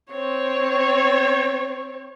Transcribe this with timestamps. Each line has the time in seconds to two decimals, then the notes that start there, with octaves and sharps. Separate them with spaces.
0.10 C4 C#5